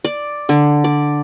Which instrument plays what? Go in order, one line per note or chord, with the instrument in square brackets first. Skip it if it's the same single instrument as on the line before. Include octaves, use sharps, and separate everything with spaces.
[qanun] D5
D3
D5